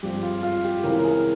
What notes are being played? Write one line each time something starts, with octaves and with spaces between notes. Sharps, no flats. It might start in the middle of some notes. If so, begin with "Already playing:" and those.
G2 F3 G#3 C4 G4
F4
F4
G4
C#3 E3 G#3 C4 A#4
A#4
G#4